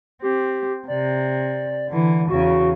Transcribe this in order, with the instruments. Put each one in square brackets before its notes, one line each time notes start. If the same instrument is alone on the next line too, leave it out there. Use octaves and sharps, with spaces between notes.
[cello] C4 [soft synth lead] G4
[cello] C3 [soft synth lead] D5
[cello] D3 E3
[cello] E2 C#3 [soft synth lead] F#4